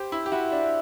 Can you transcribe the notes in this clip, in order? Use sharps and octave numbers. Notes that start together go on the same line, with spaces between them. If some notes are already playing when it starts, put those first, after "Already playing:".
Already playing: G4 C5
E4
G4
E4 F#4
D4